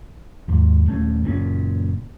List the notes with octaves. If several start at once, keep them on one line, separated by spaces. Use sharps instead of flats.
D#2 G#2
D#1 A3 C#4
F#1 A#2 C4 C#4